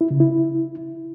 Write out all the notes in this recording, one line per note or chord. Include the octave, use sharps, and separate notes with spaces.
E4
C#3
E4